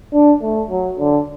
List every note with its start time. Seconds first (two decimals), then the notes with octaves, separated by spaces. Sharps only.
0.13 D4
0.42 A3
0.70 F#3
0.99 D3